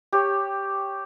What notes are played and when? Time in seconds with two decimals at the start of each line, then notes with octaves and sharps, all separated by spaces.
0.13 G4 C#5